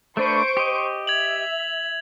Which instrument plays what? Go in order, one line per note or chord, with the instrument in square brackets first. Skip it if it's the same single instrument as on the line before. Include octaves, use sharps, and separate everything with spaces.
[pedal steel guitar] A3 D4 B4 [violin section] C5 C#6 D7
[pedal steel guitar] G4 D#5
[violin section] E5 [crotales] G#6 F7 F#7